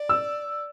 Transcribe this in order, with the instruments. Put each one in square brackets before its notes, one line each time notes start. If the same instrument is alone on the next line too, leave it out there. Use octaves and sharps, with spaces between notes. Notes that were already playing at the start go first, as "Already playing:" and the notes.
Already playing: [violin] D5
[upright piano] E6